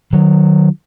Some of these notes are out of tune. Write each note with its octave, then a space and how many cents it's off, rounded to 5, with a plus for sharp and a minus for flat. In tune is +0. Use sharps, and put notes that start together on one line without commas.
D#3 -30 F#3 +0